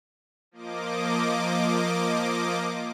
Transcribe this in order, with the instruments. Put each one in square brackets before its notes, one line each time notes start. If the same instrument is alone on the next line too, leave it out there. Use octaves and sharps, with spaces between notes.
[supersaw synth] F3 A#3 D#5 D6